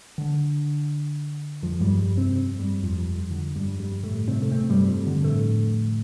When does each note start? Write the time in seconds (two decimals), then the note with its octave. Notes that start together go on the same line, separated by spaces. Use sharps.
0.18 D3
1.62 F2 F3
1.80 G2 G3
1.98 G2 G3
2.17 C3 C4
2.59 G2 G3
2.83 F2 F3
3.07 F2 F3
3.31 D3
3.56 G2 G3
3.80 G2 G3
4.03 A2 A3
4.28 C3 C4
4.42 A3
4.52 C3 C4
4.70 G2 G3
4.88 F2 F3
5.07 D3
5.24 A2 A3